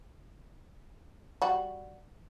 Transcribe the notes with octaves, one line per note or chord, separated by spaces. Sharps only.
G3 F#4